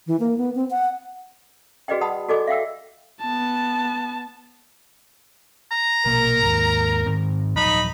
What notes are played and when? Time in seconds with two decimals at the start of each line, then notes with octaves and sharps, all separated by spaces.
0.07 E3
0.20 A#3
0.38 B3
0.55 C4
0.71 F#5
1.88 F#4 G#4 B4 D5 D#5 G5
2.01 F#5 A5 B5 D#6
2.28 F#4 A4 D5 D#5 G#5 D6
2.47 E5 F5 G5 E6
3.21 B3 A5
5.72 A#5
6.06 A#1 B2 A#3 A#4
6.42 D#2 G#2
7.06 G#2 D#3 C4
7.56 D#1 F3 F#3 D#4 B5